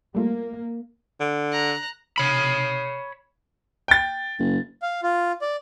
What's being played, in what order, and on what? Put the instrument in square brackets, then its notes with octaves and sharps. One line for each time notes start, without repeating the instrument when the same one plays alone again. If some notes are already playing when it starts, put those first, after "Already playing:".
[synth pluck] G3 A3 F4 [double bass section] A#3
[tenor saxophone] D3
[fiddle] A#5 F#6
[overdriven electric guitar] C#5 B5
[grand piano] G5 A6
[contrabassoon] F#1
[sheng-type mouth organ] F5
F4
D5